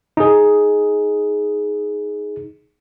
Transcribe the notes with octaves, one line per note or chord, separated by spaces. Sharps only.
D#4 G#4